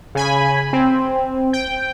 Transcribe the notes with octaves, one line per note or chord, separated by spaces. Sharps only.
C#3 G#5 B5
C4
G5